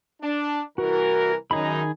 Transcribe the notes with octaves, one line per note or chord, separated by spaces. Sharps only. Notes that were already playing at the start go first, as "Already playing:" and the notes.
D4
C2 E3 F#4 A#4
F#2 D#3 D#4 G#4 B5